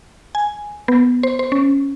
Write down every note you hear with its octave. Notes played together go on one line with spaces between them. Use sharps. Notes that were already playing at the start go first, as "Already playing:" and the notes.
G#5
B3
C5
C5
C#4